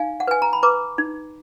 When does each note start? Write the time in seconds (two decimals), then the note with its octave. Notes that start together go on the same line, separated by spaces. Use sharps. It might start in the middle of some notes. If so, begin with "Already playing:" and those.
Already playing: D#4 F5 G#5
0.20 F#5
0.27 B4 G#5
0.42 A#5
0.53 B5
0.63 B4 A#5 D6
0.98 D#4